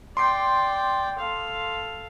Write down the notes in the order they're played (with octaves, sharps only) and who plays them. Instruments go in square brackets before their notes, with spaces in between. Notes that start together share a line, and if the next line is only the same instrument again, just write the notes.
[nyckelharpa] D5 G5 [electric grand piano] C6 D6 C7
[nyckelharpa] A4 F5